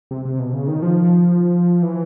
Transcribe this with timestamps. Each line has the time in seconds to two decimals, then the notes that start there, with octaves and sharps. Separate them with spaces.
0.11 C3
0.25 C3
0.39 B2
0.53 C#3
0.68 D#3
0.82 F3
1.83 E3